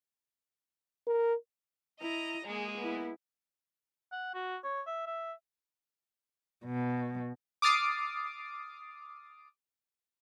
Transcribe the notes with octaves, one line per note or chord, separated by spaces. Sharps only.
A#4
E4 D#5 A#5
G#3 A#3 G#4
B3 E4
F#5
F#4
C#5
E5
E5
B2
D6 D#6 F6 A6 C7 D7